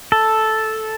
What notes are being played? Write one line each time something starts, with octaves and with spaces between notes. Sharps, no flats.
A4